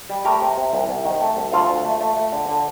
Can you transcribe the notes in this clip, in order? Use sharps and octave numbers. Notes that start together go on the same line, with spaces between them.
G3
A3 G4 A#4
C3
C3
C2
C2
D#3
A3
C2
D2 F4 A4
D2
A3
A3
A3
D3
D3